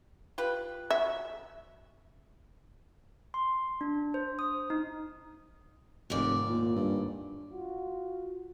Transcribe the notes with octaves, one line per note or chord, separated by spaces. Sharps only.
F4 G4 B4
F#4 E5
C6
D4
C5
D#6
D#4
F1 D#2 G#2 D5
A#2
G2
F4 F#4